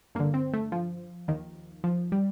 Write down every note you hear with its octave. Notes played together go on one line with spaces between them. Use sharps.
G2 D3 A#3
C4
A3
F3
D#2 D#3
F3
G3